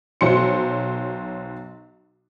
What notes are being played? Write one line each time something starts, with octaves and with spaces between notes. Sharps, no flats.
B1 F#3 C5 C6 C#7